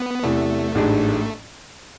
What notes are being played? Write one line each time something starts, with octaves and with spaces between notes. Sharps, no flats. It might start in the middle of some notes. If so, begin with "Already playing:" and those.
Already playing: B3
E2 C3 E3 A3
A1 G#2 G#3 D4